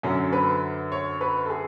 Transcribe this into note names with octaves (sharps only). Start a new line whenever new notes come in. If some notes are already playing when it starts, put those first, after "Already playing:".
F#2 D3 F#3 C#4
B4
C#5
B4
A4
G#4